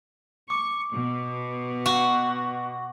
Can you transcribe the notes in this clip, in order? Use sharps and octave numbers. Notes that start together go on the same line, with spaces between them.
C#6 D6
B2
F#4